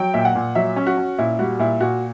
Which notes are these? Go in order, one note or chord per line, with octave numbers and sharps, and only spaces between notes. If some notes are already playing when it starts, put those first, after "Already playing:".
Already playing: F#3 G5
A#2 E5
F#5
A#2
F#3 E5
C#4
F#4
C#4
A#2 E4
G3 F#4
A#2 E4
A#2 F#4